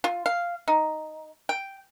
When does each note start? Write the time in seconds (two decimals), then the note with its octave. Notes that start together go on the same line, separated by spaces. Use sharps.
0.04 F4
0.26 F5
0.68 D#4
1.49 G5